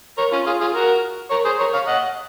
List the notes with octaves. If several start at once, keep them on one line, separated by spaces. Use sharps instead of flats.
A#4 C#5
C#4 F4
F4 G#4
F4 G#4
F#4 A#4
A#4 C#5
G#4 C5
A#4 C#5
C#5 F5
D#5 F#5